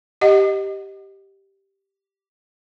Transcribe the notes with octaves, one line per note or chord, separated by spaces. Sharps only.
G4 D#5 F#5